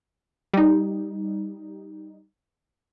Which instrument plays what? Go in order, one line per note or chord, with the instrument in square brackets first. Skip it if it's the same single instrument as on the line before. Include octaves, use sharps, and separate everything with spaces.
[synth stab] G3 D#4